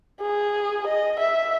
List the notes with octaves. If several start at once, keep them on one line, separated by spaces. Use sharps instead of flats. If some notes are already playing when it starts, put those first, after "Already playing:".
G#4
D#5
E5